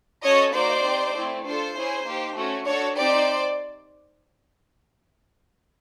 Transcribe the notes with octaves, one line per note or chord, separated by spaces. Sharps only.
C#4 F#4 A4 C#5 D#5
A#3 D#4 F#4 C5 D5
C4 D#4 G4
A3 C4 E4
D4 F4 A4 C5
C#4 E4 G#4
A#3 D#4 G4
A3 C#4 F#4
D4 F#4 A4 C#5
C4 D#4 G4 C5 D5